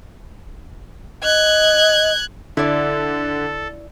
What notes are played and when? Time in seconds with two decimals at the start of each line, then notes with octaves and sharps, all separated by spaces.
1.23 D#5 F#6 G#6
2.57 D3 E4 A4 D5